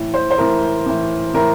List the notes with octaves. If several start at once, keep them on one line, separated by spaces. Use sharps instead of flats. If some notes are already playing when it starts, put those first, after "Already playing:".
Already playing: A2 E3
C5
C5
A2 E3 A#4
A2 E3
A2 E3 A#4